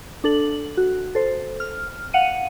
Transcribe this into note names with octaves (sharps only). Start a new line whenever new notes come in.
D4 A4 F#7
F#4
A4 C5
F6
F5 F#5 C#7 D#7